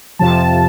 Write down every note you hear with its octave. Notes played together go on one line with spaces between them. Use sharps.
F2 C3 F3 A5